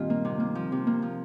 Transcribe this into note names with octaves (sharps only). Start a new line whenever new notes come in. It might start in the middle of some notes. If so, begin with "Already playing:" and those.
Already playing: G2 A#2 D#3 C4 F4
A#3
C3
A#3
F3
C3
A#3
F3